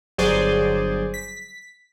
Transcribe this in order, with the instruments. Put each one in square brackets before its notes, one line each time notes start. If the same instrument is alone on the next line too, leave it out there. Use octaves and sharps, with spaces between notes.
[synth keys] G1 F#3 G#4 C5 D5
B6